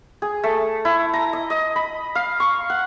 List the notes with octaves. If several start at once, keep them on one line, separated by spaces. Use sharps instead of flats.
G#4
A3
E4
A#5
D#5
D#5
B5
F5
C#6
F#5